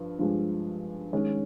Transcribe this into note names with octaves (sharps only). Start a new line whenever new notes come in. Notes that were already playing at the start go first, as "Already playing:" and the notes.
Already playing: G2 F3
G2 F3 G#3
D#3 G#3 C#4